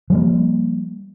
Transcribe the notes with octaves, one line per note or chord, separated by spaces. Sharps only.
F3 G3 A#3